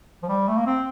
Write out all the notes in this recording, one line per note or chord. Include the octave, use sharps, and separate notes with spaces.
F3
G3
A3
A#3
C4